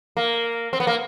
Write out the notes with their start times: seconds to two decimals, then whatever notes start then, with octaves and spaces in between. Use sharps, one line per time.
0.17 A#3
0.73 C4
0.80 B3
0.87 A#3